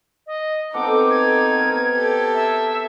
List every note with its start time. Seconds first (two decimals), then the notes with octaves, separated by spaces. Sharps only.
0.27 D#5
0.74 B3 C4 D#4 A4 F#5 D6
1.10 G#6
1.58 B3 A#4
1.94 G4 A4
2.34 E5